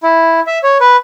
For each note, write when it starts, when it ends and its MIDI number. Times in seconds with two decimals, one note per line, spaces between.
0.03 0.40 64
0.47 0.59 76
0.63 0.78 73
0.81 0.96 71